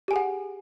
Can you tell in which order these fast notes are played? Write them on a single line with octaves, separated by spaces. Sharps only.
G4 G#5 G#4 F#5